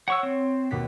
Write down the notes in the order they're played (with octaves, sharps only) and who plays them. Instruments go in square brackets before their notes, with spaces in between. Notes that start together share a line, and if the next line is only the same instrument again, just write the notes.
[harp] C#5 [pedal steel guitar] F#5 C#6 E6
[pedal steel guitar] C4
[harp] D#2 B2 B6